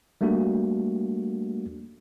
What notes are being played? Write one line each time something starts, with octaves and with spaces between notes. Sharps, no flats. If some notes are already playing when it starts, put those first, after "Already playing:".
G3 A3 A#3 D4 F#4